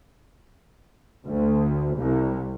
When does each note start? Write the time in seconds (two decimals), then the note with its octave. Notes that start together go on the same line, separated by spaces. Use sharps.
1.26 D2
1.95 C2